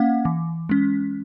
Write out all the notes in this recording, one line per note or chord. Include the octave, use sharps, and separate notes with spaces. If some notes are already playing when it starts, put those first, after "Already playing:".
Already playing: A#3 C#4 F5 F#5
E3
G#3 C#4